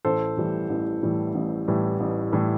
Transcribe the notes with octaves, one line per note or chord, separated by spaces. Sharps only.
A1 A4 C5
A2 E3 G3
A1
A2 E3 G3
A1
A2 E3 G3
A1
A2 E3 G3